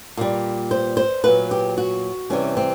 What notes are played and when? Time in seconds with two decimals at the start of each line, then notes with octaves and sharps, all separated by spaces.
0.17 A#2 G3
0.71 C5
0.97 C5
1.24 A#2 F#3 B4
1.51 G4
1.77 F#4
2.30 C3 E3 G3 C#4
2.57 C4